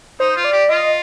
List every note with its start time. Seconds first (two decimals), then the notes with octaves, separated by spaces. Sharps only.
0.20 D#4 C5
0.36 F4
0.45 D5
0.53 G4
0.69 F4 D#5